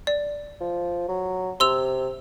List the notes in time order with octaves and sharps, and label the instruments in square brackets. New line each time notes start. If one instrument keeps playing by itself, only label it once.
[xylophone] D5
[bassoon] F3
F#3
[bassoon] C3 [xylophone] C6 E6 F7